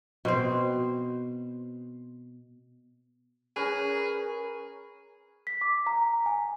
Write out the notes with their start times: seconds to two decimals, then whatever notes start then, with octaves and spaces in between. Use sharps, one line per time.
0.25 B2 C4 C5
3.56 C#4 G#4 A#4 B4
5.47 B6
5.61 D6
5.87 A#5
6.26 G#5